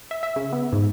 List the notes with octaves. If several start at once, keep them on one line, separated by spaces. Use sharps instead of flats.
E5
E5
C#3
B3
G#2